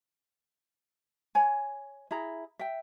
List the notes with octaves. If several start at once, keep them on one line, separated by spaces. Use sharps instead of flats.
C#5 G#5
E4 G#4 A#5
E5 G5